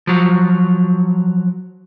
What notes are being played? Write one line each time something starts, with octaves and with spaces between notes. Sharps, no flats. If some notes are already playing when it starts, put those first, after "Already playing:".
F3 F#3